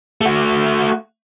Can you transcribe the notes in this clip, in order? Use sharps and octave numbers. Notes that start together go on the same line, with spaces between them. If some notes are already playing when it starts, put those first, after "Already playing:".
A3 F#4